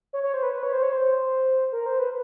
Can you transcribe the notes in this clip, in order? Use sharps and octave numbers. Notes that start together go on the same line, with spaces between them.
C#5
C#5
C5
B4
B4
C#5
C5
C#5
C5
A#4
C5
B4